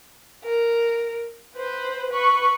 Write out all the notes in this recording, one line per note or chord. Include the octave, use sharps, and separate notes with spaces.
A#4
B4 C5
B4 C#6